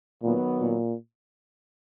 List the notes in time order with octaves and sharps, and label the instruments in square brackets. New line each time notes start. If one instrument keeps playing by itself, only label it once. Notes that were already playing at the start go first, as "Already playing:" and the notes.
[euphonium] A#2 [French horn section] D#3 F#3 B3
[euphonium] A#2